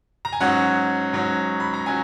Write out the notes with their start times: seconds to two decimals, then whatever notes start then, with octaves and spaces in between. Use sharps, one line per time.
0.25 A#5
0.32 G#5
0.40 G#2 F#3 C#4 F#5
1.13 G#2 F#3 C#4
1.60 B5
1.73 A#5
1.86 F#3 C#4 G#5